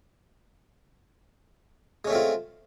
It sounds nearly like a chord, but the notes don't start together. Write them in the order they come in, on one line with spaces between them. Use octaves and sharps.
G#3 C#4 A3 C4 F4